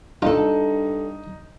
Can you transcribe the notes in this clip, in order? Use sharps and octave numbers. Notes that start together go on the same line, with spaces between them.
G2 D4 D#4 F4 A4